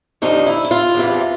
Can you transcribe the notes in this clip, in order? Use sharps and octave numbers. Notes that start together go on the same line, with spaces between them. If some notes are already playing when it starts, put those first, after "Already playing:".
D#2 D3 F3 D#4
E4
E4
F4
E2 C3 E3